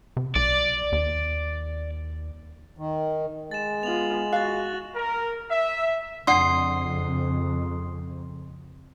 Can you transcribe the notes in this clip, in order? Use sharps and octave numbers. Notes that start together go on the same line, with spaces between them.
C3
B1 D5
D#2
D#3
G#3 A6 E7
B3 F4 F7 F#7
F#4 F5 F#6 A6
A#4
E5
F2 C#3 D4 D5 F#5 C6 D#6 C7